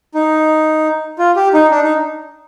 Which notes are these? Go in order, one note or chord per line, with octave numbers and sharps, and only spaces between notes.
D#4
F4
G4
D#4
D4
D#4